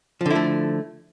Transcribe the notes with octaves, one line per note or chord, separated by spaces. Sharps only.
D3 F3 A3 E4